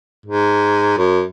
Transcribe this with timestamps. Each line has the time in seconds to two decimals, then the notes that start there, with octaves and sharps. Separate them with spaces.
0.26 G#2
0.97 F#2